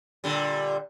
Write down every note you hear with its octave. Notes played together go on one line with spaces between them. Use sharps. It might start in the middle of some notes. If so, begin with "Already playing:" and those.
A#2 D3 G3